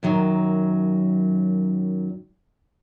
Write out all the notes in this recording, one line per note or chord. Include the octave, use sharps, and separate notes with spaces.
F#2 D#3 F#3